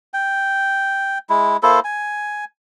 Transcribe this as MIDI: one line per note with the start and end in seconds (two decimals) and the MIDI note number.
0.14 1.18 79
1.30 1.57 56
1.30 1.57 64
1.63 1.80 58
1.63 1.80 64
1.63 1.80 69
1.63 1.80 72
1.84 2.45 80